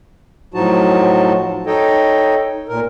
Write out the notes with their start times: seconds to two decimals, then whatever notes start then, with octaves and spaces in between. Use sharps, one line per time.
0.54 A2 F3 F#3 D#4 F#4 A5
1.66 D#4 A4 C#5 D#5 G5
2.69 A#2 A#4